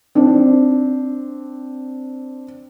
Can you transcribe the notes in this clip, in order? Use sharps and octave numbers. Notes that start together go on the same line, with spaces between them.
C4 D4